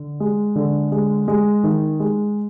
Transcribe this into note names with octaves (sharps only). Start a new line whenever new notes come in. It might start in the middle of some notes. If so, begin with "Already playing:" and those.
Already playing: D3
G#3
D3
G#3
G#3
D#3
G#3